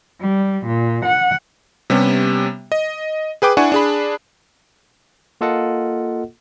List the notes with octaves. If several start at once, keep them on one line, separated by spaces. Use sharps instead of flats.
G3
A#2
F#5
C3 G3 B3 C#4
D#5
G#4 B4 G5 D6
D4 E4 F#5 G#5 C#6
D4 G#4 B5
A#3 F4 A4 D#5 F#5